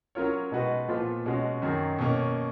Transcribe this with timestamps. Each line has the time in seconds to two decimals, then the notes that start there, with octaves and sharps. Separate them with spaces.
0.15 F#3 C#4 F4 A#4 C#5
0.52 B2 G#3 D#4 F#4 B4
0.88 A#2 F3 B3 F4
1.26 B2 G#3 C#4 F#4
1.62 F#2 D#3 F#3
1.99 B2 A#3 C#4